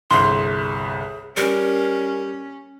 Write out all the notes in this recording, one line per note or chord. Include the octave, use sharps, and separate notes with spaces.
G1 C2 G#4 C6
G3 C#4 A#4